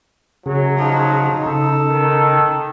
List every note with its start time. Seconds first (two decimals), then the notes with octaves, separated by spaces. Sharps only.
0.46 F#2 C#3 F#3 G#4
0.78 F3 D#4
1.46 C#3 A4
1.88 D#3